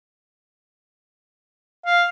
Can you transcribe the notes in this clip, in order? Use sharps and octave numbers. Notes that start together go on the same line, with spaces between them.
F5